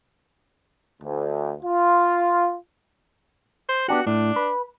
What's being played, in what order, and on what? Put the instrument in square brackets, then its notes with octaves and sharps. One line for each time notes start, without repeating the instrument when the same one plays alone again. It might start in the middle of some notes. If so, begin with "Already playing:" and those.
[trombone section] D2
F4
[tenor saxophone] C5
[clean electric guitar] B3 D4 G4 [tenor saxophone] F#4
[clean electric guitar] A2 [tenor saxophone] D4
[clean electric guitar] B4